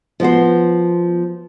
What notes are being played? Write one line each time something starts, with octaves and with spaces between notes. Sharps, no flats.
F3 B3 F#4 C5